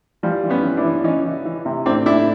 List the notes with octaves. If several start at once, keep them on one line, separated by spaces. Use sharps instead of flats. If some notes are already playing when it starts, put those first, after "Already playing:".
E3 F3 G3
E3
B3 C#4
E3
D4 E4
E3
E3 C#4 D#4
E3
E3
C3
A2 C4 D4
A2 D4 E4